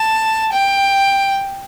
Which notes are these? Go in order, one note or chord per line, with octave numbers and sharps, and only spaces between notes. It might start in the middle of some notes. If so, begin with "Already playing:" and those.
Already playing: A5
G5